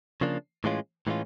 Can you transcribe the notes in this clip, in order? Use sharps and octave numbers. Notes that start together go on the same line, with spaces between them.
C#3 F3 A#3 D4
A2 E3 G#3 C#4 F4
A2 E3 G#3 C#4 F4